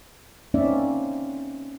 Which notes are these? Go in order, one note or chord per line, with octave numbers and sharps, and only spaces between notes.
A#3 C4 C#4 D#4 D5 E5